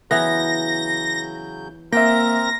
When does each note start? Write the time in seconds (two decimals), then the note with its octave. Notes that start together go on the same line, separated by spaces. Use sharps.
0.11 C#3 E3 F#3 B3 G6 A#6
1.92 A#3 C4 A#4 E5 G5 A#5 A#6